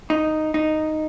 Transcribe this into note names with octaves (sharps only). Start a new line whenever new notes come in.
D#4
D#4